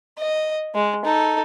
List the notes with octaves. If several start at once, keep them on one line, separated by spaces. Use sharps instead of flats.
D#5
G#3
D#4 A4